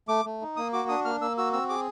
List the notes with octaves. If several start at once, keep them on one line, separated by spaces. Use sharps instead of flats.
A3 D6
A3
D#4
A#3 D#6
F#4 D6
D4 D#6
A#3 F6
A#3 E6
F#4 E6
C4 E6
G#4 D6